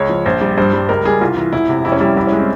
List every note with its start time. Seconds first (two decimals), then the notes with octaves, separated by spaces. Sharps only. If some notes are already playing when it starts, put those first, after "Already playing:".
Already playing: C#2 C#5
0.09 F3
0.26 A#1 C5
0.41 G3
0.58 G2 C5
0.73 G3
0.89 C#2 A#4
1.05 G3 G#4
1.21 C2 F4
1.37 E3
1.53 E1 E4
1.69 C3
1.85 F2 E4
1.92 C#4
2.00 G3 E4
2.16 C2 E4
2.27 C#4
2.32 G#3
2.38 C4